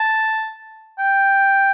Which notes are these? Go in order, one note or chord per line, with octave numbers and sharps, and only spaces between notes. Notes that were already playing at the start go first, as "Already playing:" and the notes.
Already playing: A5
G5